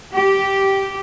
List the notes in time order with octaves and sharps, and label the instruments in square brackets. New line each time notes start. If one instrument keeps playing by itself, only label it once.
[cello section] G4